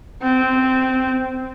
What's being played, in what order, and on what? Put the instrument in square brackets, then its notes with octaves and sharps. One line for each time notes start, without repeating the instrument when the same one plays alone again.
[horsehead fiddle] C4